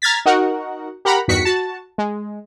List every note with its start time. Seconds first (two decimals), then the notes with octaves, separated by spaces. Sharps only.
0.02 A#5 F6 G#6 A6 B6
0.25 D#4 F#4 A#4 F#5
1.05 G4 A#4 F#5 A#5 B5
1.28 E2 G2 D#3 F#4 B6 C#7
1.45 F#4 A5
1.98 G#3